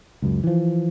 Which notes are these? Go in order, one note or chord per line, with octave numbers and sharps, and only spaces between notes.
C#2 F#2
E3 F3